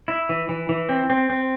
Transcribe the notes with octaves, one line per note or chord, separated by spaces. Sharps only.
E4
E3
E3
E3
C4
C4
C4